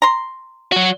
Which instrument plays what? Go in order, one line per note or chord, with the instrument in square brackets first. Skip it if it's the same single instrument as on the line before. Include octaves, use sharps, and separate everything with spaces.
[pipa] A#5 C6
[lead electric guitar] F#3 F#4